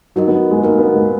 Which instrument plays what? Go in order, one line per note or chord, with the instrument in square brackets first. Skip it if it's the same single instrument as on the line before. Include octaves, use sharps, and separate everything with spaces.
[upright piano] F#3 [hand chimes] D#4 F#4 A#4 D#5
[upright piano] B3
G#3
[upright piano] A#3 [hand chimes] D#4 F#4 A#4 D#5
[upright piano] B3
G#3